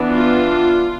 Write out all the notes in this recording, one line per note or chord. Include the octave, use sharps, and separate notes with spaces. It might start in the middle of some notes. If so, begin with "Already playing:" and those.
Already playing: E3 B3 D4
F4